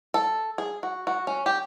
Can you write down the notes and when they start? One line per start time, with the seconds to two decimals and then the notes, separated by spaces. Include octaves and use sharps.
0.14 A4
0.58 G#4
0.83 F#4
1.07 F#4
1.27 C#4
1.46 G4